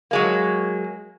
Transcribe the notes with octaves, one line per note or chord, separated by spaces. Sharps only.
F#3 G#3 A#3